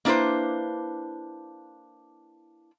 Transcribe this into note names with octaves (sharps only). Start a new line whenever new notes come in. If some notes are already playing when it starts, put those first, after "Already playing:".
A#3 D4 E4 B4 C5